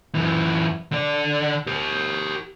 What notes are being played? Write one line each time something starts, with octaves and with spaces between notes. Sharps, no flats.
F#2 E3
D3 D5
G4 A#4